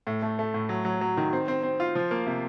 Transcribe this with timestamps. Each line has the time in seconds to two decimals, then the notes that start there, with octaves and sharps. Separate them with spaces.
0.07 A2
0.22 A3
0.39 A3
0.54 A2
0.69 F#3
0.85 F#3
1.01 F#3
1.17 D#3
1.33 C4
1.48 C4
1.63 C4
1.80 F4
1.95 F3
2.11 A#3
2.26 C3